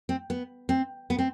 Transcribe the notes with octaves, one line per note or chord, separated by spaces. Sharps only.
C4
B3
C4
B3
C4